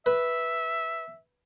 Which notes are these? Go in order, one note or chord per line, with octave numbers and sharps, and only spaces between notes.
B4 E5